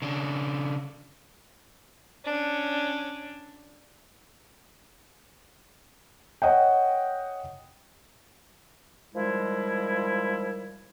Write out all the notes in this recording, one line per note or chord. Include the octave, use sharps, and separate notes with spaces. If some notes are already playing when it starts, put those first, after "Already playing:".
C#3 D4
C#4 D4
C#5 D#5 F#5 G5
D#3 F3 G3 G#3 E4